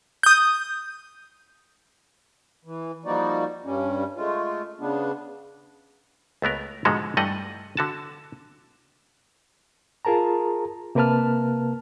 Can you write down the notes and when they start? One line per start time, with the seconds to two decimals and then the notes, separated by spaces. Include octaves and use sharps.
0.23 D#6 G6
2.65 E3
3.05 F3 G3 A#3 D#4 F#4 D5
3.65 G2 G3 C#4
4.16 G#3 A3 F4
4.80 C#3 B3 D4
6.42 C#2 A3 B3 A#4
6.85 G#2 B2 D3 F3 G#3 F#4
7.17 G2 E3 G3 A3 D#5 F#5
7.77 D3 F#4 A5
10.05 F4 G#4 A#4 A5 A#5
10.95 C3 A#3 A#4 B4 A5 F6